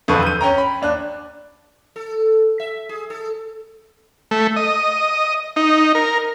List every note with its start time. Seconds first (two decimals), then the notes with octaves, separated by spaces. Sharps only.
0.08 E1 F2 D3 F3 B4 C#6
0.23 G6 D#7
0.41 C#4 G5 A#5
0.58 B5
0.82 D#2 D4 F#6
1.96 A4
2.60 E5
2.89 G#4
3.10 A4
4.31 A3
4.56 D#5
5.56 D#4
5.95 A#4